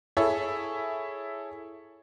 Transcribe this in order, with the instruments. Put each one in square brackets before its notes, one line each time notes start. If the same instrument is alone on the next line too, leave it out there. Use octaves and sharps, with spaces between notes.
[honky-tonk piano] E4 G#4 A4 C#5 E5